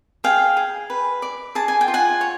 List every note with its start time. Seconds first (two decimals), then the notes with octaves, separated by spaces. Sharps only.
0.24 G#4 F5 G5
0.57 G#4
0.90 B4
1.22 D5
1.55 G#4 A5
1.68 G#5
1.81 G5
1.88 F4
1.94 F#5 G#5
2.21 C#5